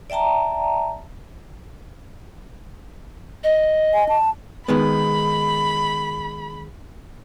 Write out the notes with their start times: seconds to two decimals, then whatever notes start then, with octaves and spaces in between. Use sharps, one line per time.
0.10 D5 E5 G5 A5 A#5
3.43 D#5
3.94 G#5
4.09 A5
4.68 D#3 G#3 B3 B5